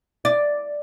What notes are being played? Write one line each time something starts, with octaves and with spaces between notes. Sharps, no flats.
D5